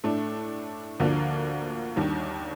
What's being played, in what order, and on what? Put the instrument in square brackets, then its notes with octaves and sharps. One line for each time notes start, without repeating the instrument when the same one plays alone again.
[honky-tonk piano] A2 A3 D4
D2 D3 F3 A#3 D4
D#2 D#3 G3 D4